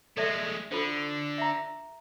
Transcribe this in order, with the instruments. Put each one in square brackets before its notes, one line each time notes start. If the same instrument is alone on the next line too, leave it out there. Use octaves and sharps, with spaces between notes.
[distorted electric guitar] G#3 A3 [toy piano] A4 D5 E5
[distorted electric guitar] D3 [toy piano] F4 A4 C5
[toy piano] E5 A#5